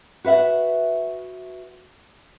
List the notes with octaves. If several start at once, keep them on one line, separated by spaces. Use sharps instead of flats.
F#4 B4 E5 F#5